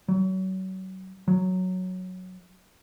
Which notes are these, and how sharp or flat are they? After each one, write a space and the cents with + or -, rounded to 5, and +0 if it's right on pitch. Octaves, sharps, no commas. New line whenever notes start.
F#3 +30
F#3 -5